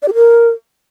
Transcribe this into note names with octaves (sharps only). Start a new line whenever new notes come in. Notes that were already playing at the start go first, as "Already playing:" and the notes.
D5
G4
A#4